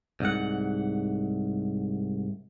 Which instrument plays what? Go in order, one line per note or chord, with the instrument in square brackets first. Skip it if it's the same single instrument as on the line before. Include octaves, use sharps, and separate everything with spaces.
[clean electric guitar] C2 G#2 F#5